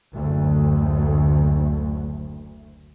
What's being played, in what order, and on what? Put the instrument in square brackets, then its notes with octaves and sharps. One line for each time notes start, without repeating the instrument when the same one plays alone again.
[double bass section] F#1 D2